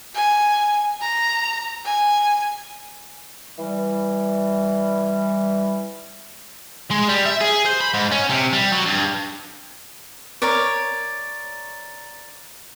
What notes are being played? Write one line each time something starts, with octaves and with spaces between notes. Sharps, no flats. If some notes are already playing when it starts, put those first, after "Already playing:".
G#5
A#5
G#5
E3 G3
G#3
G3
E5
G#4
C5
B5
G#2
C#4
C3
G3
F#3
G2
A#4 C#5 D5